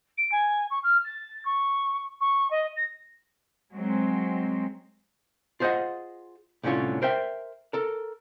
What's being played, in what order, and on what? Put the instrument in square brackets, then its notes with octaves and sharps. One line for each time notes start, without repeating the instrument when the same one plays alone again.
[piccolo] D7
G#5
C#6
F6
A6
C#6
C#6
D#5
A#6
[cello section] F#3 G#3 C4
[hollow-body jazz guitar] F4 G#4 C5 D5 D#5 F#5
C2 A2 D3 C#4 F4 C#5
A#4 C5 E5 G5
A4 A#4